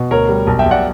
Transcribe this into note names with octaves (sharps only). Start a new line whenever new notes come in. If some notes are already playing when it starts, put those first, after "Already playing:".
Already playing: B2
D2 A#4 C#5
G3
B1
E5 G5
B1
D5 F#5